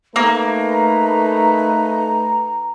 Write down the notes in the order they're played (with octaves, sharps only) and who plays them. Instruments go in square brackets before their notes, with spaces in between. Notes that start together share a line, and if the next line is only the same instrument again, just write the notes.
[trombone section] A3 D#4 B4 [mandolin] A#3 [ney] A#5